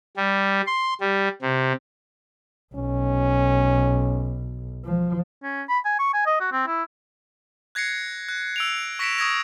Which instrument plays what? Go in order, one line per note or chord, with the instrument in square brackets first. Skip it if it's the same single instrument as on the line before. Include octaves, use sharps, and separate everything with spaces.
[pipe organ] G3
C6
G3
C3
[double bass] B1 [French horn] C#4
[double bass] F3
[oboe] C#4
B5
G#5
C#6
G#5
D#5
F#4
C4
E4
[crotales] F#6 G#6 A#6 C7 C#7
F#6
E6 D7 F7
C#6 A#6 B6 C#7 D7 E7
C#6 D#6 G#6 A#6